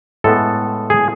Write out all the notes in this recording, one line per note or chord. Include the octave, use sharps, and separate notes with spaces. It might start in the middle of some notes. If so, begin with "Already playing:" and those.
A2 G#3 B3 A4
G#4